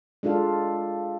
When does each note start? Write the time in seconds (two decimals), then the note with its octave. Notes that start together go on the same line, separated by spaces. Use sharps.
0.23 G#3 D4 F4 A4 F5